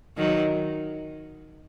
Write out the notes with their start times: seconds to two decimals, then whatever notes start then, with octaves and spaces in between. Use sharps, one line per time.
0.17 D#3 F#3